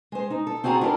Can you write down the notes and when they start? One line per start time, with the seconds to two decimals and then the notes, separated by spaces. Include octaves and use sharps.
0.12 G#3 C5
0.30 D#4
0.47 A4
0.64 C4 F4 F#4 G#4 A#5
0.81 D4 E4 F4 A4 A#4